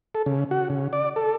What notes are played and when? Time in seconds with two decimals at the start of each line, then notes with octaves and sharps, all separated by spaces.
0.15 A4
0.26 C#3
0.51 F#4
0.70 C#3
0.93 D5
1.16 A4